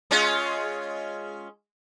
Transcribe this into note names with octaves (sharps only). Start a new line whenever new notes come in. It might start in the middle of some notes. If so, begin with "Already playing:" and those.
G#3 C#4 F4